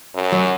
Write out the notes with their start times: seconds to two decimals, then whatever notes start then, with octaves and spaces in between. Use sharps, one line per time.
0.15 F#2
0.32 F#3